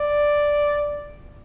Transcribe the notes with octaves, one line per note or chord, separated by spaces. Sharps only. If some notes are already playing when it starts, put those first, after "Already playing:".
Already playing: D5